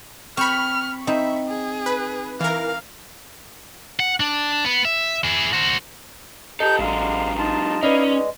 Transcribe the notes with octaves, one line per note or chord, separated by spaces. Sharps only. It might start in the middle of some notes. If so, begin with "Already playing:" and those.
C4 B5 C#6 F6
C4 D#4 E5
G#4
B4
E3 A#4 F5
F#5
D4
B3
E5
E4 G#4
F#4 C5
G4 A4 D#5 G6
A1 G#2 D3 F#3 G#3 F5
D#4 F4 A5
C#4 E4 B4 D5 D#5 F5
G#3